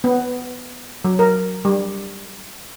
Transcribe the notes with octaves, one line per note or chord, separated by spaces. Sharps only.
B3
F#3
A#4
G3